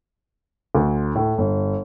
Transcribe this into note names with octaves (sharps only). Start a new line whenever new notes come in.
D2
A2
G1